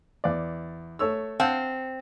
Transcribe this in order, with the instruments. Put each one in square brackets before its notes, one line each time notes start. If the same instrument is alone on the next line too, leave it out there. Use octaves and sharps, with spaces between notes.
[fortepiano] E2 D5
A3 C#5 E6
[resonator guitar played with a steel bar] C4 [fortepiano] F5 F#5 A5